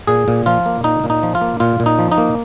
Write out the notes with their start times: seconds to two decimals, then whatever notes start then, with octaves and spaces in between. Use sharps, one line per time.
0.07 A#2 G#4
0.28 A#2
0.46 F3 F4
0.66 A#3
0.84 A#2 D#4
1.04 A#2
1.10 D#4
1.23 F3
1.35 F4
1.41 A#3
1.60 A#2 F4
1.80 A#2
1.86 D#4
1.99 F3
2.12 D#4
2.18 A#3